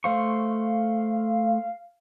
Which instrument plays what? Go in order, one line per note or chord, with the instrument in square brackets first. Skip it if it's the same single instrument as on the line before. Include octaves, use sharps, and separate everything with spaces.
[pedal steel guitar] A3 C5 C#6 [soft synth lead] F5